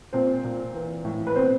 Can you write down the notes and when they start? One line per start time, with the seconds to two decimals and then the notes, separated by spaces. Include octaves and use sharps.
0.13 A#2 C4 C5
0.44 A#2
0.74 E3
1.05 A2
1.27 B4
1.35 B2 C4 C5